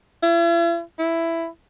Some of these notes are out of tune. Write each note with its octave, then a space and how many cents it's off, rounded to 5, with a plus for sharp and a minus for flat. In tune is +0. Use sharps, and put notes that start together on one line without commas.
E4 +45
E4 +10